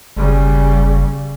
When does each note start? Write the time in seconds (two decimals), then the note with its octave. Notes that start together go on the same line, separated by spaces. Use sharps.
0.16 F#1 C#3 G3